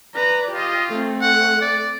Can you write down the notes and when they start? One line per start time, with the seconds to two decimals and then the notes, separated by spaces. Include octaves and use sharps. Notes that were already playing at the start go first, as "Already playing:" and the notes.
0.15 B4 D5 A#5
0.52 F4 G4 D#5
0.89 A3 C4
1.21 F#5
1.61 D5